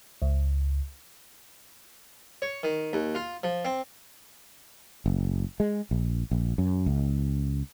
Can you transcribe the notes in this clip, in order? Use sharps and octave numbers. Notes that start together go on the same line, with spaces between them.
C#2
C#5
D#3
D#2
F4
F3
C4
F#1
G#3
A#1
A#1
F#2
C#2